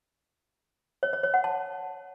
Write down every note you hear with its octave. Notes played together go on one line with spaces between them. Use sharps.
C#5
C#5
C#5
F#5
A5